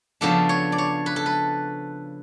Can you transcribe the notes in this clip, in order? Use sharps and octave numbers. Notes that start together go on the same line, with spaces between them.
C#3 F3 B3 D4 A4
C#5
D5
C#5
B4
A4
B4